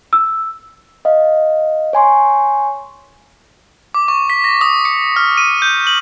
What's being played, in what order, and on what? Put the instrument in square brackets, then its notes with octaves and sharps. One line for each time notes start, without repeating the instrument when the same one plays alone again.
[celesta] E6
[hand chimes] D#5 F5
C#5 G#5 C6 C#6
[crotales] D6
C#6
B6
A#6
D#6
C#7
F6
D#7
G6
F#7